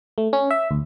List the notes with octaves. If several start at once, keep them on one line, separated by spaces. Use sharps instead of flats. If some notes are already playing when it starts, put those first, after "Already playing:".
A3
C#4
E5
D2